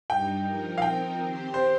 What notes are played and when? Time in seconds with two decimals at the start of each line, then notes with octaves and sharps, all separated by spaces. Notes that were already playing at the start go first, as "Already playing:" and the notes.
0.09 G2 G3 D#4 G5
0.45 F3 D#4 A#4
0.78 F5
0.81 F3 C4 D#4 A#4 G5
1.18 D#3 C4 G4 C5
1.54 C5